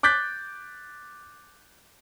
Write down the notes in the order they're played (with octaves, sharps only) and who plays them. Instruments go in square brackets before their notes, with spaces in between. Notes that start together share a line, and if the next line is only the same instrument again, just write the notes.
[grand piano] D6 F#6 G6 A6 B6